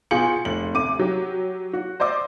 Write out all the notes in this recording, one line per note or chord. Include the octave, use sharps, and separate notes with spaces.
B2 F4 G#4 G6 C#7 F#7
F1 F#7
D2 C3 D6 D#7
F#3 G4
F#4
C5 D5 D#5 D6 E6